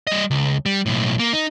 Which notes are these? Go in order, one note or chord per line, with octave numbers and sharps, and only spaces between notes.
G3 D#5
C#2
G3
B1 A2
A#3
D#4